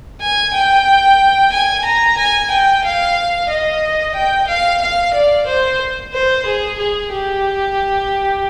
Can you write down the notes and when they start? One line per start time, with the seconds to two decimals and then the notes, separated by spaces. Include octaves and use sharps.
0.20 G#5
0.53 G5
1.52 G#5
1.84 A#5
2.17 G#5
2.50 G5
2.84 F5
3.49 D#5
4.14 G5
4.47 F5
4.81 F5
5.14 D5
5.46 C5
6.13 C5
6.45 G#4
6.78 G#4
7.11 G4